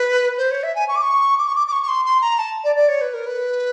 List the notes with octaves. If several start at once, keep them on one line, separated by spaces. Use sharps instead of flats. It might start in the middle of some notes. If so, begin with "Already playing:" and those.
Already playing: B4
C5
C#5
E5
G#5
C#6
D6
C#6
D6
C#6
D6
D6
C#6
C#6
C6
C6
A#5
A5
D5
D5
C#5
B4
A#4
B4